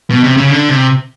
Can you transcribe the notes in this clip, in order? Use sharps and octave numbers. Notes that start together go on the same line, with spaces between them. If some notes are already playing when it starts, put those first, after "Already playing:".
B2
C3
C#3
D3
C3